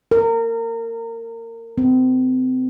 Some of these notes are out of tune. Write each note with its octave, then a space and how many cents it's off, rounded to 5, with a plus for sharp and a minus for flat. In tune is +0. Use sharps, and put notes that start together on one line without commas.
A#4 -25
C4 -35